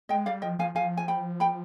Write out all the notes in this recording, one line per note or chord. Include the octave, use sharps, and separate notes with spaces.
G#3 D#5 G5
G3 D5 F5
F3 D#5 G5
F3 F5 G#5
F3 F5 G#5
G#5
G5 B5
G5 B5